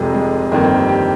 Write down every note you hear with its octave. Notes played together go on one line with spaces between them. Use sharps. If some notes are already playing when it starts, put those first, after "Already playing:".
Already playing: F1 F2 C3 G#3
G#3
G1 F2 D#3 A#3
C4
G4
G4